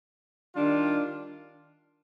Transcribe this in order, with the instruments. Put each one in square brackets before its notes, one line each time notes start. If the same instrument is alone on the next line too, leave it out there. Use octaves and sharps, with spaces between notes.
[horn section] D#3 G3 D4 F4